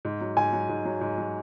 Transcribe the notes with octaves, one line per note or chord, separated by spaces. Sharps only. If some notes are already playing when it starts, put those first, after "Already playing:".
G#2
F#3
G#2 G#5
F#3
G#2
F#3
G#2
F#3